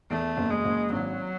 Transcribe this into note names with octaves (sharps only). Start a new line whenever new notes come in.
E2 A3
F#1
G#3
F#1
G#1 F#3